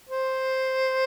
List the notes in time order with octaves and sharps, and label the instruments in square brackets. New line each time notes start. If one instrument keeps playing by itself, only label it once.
[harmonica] C5